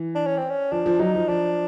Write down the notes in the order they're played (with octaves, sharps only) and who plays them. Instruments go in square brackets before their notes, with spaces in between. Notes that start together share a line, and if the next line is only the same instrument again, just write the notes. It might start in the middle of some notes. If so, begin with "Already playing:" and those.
Already playing: [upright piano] E3
[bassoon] D4
C#4
C4
C#4
[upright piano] F3 [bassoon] D4
[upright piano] F3
[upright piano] F#3 [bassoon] D#4
[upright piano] F3
[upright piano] F3 [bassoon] D4